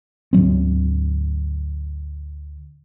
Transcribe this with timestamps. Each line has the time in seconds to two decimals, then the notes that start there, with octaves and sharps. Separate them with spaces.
0.33 D2 G#2 F#3 C4